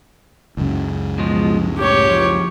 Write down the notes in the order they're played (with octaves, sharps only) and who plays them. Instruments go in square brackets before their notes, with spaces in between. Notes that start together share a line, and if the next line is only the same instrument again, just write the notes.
[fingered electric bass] C#2 F#2 C#3
[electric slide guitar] B2 F3 G#3
[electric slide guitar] A2 [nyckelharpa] G4 C#5
[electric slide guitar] F3